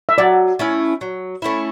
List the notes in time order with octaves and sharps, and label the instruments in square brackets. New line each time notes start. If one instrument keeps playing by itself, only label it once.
[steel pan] E5
[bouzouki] F#3 [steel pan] D5
[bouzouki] A3 C#4 E4
F#3
A3 C#4 E4